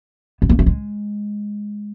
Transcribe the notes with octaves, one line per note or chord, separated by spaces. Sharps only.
B3
A#3
A3
G#3